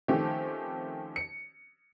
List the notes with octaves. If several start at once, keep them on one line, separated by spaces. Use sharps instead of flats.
D#3 F3 A3 C4 C#4 G4
C#7